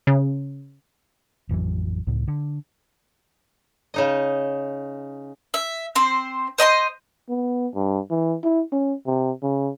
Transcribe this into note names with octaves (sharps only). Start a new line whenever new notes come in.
C#3
A1 F2 E3 F#3
C#2 A2
D3
C#3 D#4 D#5
E5
C4 C5
C5 D#5 B5 C6
B3
G2
E3
E4
C#4
C3
C#3